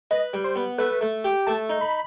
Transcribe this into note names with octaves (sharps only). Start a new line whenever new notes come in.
B4 D#5
G3
C5
B3
A3 B4
A3
G4
A3 A5
D#4
B5